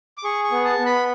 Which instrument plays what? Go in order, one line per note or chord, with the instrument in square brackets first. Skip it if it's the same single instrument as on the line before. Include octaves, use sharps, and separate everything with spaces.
[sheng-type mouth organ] D6
G#4 C#6
C#6
B3
A5
B3
B5